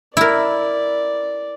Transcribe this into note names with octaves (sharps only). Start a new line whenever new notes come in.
E4 A#4 D5